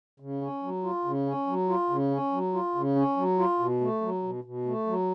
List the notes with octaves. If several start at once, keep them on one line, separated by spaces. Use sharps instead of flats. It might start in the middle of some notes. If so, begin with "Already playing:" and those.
C#3
C#4
F#3
F4
C#3
C#4
F#3
F4
C#3
C#4
F#3
F4
C#3
C#4
F#3
F4
B2
A3
F#3
B2
B2
A3
F#3